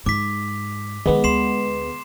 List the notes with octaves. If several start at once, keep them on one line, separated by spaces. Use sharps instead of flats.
G#2 D6 B6
D#3 G#3 B3 D#4
D2 C6 C7 E7